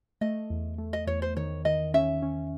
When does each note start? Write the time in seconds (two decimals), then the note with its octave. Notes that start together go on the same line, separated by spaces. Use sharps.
0.21 A3 D#5
0.50 E2
0.78 A3
0.93 D#5
1.07 E2 C#5
1.22 C5
1.37 D#3 C#5
1.65 D#3 D#5
1.94 C#4 E5
2.22 C#4